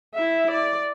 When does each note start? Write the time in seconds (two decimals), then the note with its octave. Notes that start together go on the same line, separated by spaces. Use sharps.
0.14 E4 E5
0.51 D5